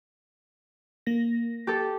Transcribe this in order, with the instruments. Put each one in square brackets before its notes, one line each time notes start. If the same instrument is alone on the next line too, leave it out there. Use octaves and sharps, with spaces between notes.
[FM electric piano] A#3 A#6
[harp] G4 A4